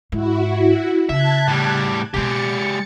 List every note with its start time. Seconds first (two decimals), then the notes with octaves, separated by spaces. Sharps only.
0.12 G#2 E4 F#4
1.09 C#3 E5 A5 F#6 G#6
1.48 A2 G3
2.14 B2 G#3 B3 G4 A6 C#7